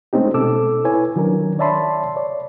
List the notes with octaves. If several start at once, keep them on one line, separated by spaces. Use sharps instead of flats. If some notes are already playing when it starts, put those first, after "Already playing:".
G#3 A3 C4 C#4 D#4 G4
B2 A4 D6 E6
E4 B4 C#5 G#5
D#3 F#3 C#4 D4 A#4
C#5 D5 E5 A5 B5 C6
C#5 D5